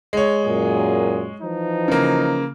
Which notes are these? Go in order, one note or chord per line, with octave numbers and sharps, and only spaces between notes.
G#3 C#5
F#2 A#2 G#4
E3 F3 D#4
C#3 A#3